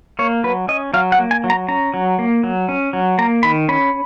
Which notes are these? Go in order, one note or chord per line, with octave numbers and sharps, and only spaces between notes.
A#3 C#5
F#3 B4
C#4 D#5
F#3 F5
F#5
A#3
G#5
F#3
A#5
C#4 A#5
F#3
A#3
F#3
C#4
F#3
A#3 A#5
D#3 B5
C#4 B5